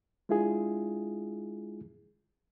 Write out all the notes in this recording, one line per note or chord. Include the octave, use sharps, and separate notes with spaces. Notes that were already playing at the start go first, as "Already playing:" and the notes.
G#3 D4 E4 F4 G#4